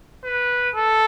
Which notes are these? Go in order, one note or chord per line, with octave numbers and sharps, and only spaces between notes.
B4
A4